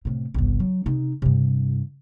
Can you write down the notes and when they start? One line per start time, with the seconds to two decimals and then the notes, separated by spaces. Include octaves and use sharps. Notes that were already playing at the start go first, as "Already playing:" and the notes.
0.05 A2 C3
0.34 G1 C2
0.60 F#3
0.86 C3 D#4
1.22 G2 C3